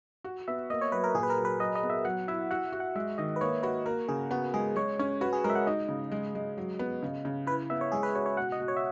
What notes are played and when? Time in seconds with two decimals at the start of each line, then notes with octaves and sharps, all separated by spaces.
0.24 F#4
0.48 B3 E5
0.70 A#3 D#5
0.81 C#5
0.92 F#3 B4
1.04 A#4
1.14 A#2 G#4
1.23 B4
1.30 A#4
1.38 F#3
1.45 B4
1.60 F#3 D#5
1.75 D#5
1.83 B3
1.90 E5
2.05 F#3 F#5
2.28 E4 E5
2.51 F#4 F#5
2.72 F#4
2.80 F#5
2.95 G#3 E5
3.18 D#3 D#5
3.36 B4
3.41 A#3 C#5
3.63 F#4 B4
3.86 A#3 A#4
4.08 C#3 G#4
4.31 B3 F#4
4.54 G#3 G#4
4.76 G#3 C#5
4.99 C#4 C#5
5.21 F#4 B4
5.33 G#4
5.44 G#3 A#4
5.50 E5
5.55 F#5
5.67 D#4 D#5
5.89 C#3
6.12 G#3
6.35 G#3
6.57 F#3
6.79 B3
7.03 C#3
7.25 C#3
7.47 E4 B4
7.70 B3 E5
7.81 C#5
7.92 G#3 G#4
8.03 B4
8.15 F#4 C#5
8.26 C#5
8.37 B2 F#5
8.52 D#5
8.60 B2
8.68 C#5
8.77 E5